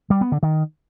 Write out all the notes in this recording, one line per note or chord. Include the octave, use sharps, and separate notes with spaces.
G3
B3
D3
D#3